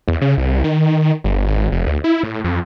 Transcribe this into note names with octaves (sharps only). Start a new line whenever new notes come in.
E2
C#3
C2
D#3
G1
G#1
F1
D2
E4
A2
F2